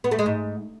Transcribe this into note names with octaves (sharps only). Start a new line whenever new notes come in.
B3
A3
G#3
G#2